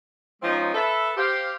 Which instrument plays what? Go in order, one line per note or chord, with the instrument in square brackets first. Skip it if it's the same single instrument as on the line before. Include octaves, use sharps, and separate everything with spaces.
[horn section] F3 G#3 C4 C#4 D#4
A4 B4 E5
G4 C5 F5